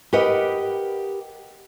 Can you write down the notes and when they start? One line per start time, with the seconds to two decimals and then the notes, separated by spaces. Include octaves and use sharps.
0.13 G4 A#4 B4 D#5 F#5 G5